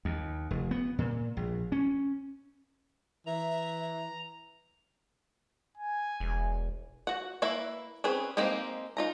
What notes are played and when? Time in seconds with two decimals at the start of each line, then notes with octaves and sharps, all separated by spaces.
0.05 D#2
0.51 F1
0.71 B3
0.99 A#2
1.37 A#1
1.72 C#4
3.26 E3 E5 A#5
5.78 G#5
6.20 E1
7.07 F#4 F#5
7.42 A#3 E4 B4 E5 B5
8.04 C4 C#4 G#4 B4
8.37 G#3 A#3 C4 D#4 G4
8.97 D#4 F4 A#5